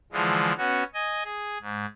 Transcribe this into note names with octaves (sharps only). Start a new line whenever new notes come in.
D3 E3 F3 G#3
B3 C#4 F#4
D#5 G#5
G#4
G#2